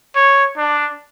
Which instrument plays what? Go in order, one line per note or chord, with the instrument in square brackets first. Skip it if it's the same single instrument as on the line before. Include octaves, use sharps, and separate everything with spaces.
[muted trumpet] C#5
D4